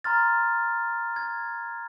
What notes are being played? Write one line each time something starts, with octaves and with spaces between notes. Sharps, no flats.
A#5 C6 F6 A6
G#6